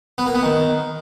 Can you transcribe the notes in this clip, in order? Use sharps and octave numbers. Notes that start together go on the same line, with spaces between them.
B3
A#3
B3
D#3